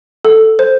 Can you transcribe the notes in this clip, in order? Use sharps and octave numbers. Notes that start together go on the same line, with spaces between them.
A4
C5